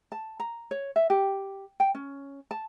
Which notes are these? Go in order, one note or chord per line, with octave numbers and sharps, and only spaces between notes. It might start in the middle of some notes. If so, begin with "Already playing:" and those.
A5
A#5
C#5
E5
G4
G5
C#4
A5